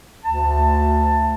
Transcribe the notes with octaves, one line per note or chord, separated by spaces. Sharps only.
D2 A5